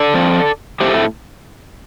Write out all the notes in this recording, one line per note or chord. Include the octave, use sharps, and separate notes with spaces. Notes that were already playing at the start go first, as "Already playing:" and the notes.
Already playing: A4 D5
F3 C4
A2 A3 C4 G4 C5